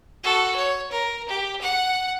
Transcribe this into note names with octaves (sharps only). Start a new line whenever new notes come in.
F#4 A4
C#5
A#4
G4
F#5